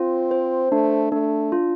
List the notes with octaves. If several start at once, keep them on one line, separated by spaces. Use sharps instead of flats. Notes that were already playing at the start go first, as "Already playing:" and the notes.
Already playing: C4 F4
C5
A3 D4
A3 D4
F4